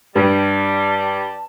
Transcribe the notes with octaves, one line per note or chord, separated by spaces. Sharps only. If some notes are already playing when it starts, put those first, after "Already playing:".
G2 G3 A5